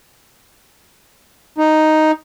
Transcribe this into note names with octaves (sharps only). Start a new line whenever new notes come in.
D#4